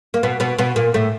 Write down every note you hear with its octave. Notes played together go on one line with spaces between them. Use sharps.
A#3
B2 B3
B2 B3
B2 B3
A#2 A#3
A2 A3